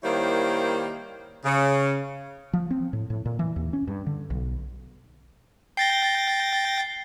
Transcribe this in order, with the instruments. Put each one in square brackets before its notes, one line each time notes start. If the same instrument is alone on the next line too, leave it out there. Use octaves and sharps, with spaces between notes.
[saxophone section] D#3 G3 A#3 E4 C5 C#5
C#3
[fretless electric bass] F3
C4
A2
A2
A#2
E3
D#2
C#4
G2
D3
B1
[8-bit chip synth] G5 A6 A#6 [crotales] C7 G7